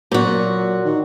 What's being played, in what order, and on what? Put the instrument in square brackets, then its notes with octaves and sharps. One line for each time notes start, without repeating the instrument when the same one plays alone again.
[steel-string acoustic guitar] A#2 F#4 [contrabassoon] F#3
[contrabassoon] D#3